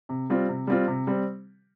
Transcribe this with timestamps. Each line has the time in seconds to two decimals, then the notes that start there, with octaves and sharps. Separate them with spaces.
0.09 C3
0.30 G3 C4 F4
0.49 C3
0.67 G3 C4 F4
0.87 C3
1.07 G3 C4